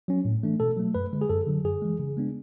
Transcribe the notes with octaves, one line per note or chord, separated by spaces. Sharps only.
F#3 C#4
A2
E3 A3 D4
B2 A4
F#3 A3
F#2 B4
D3 G#3
G#4
F#2 A4
D3 F#3
F#2 G#4
E3 G#3
C#3
G#3 B3 D4